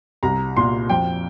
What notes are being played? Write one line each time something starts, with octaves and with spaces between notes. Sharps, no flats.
C2 A#5
A#2 C6
F2 G5